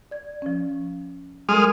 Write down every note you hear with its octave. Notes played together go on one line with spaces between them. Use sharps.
D5 G#6
F3 C#4
F#3 G#3 A4 A#4 D#6 F6